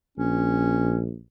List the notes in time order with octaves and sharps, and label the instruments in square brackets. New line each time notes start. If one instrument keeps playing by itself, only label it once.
[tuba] A#1 [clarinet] C#4